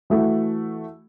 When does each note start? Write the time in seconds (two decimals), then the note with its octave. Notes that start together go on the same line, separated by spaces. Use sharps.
0.10 E3 A3 F#4